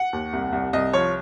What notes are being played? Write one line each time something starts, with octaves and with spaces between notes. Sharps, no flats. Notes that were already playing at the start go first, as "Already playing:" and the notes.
Already playing: F#5
D#2
C2
C2
C2 D#5
F3 C#5